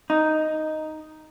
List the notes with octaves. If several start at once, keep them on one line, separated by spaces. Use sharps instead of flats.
D#4